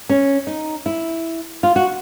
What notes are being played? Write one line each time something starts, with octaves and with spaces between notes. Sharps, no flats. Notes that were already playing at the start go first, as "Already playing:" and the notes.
C#4
D#4
E4
F4
F#4